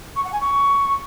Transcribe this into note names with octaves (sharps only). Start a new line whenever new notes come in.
C#6
F#5
G#5
C#6